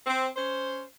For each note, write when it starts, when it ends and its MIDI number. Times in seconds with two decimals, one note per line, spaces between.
0.05 0.28 60
0.35 0.82 61
0.35 0.82 72